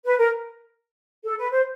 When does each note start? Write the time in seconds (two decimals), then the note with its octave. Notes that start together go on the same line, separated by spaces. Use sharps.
0.05 B4
0.18 A#4
1.24 A4
1.38 B4
1.51 C5